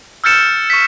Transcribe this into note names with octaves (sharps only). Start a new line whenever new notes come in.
E6 F6 G6 A6 C#7 E7
C#6 B6